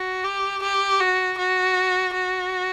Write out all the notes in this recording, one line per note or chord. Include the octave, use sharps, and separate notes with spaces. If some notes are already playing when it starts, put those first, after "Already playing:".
Already playing: F#4
G4
G4
F#4
F#4
F#4